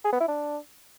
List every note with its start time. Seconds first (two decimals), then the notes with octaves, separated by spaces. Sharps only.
0.05 G#4
0.13 B3
0.20 E4
0.28 D4